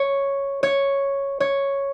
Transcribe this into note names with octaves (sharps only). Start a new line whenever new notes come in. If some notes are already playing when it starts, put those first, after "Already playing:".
Already playing: C#5
C#5
C#5